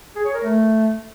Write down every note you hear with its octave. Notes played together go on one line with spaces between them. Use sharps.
G#4
C#5
A#4
A3